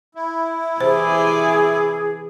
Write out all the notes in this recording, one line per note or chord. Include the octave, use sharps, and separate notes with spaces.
E4
C3 E3 G#4 C5 D5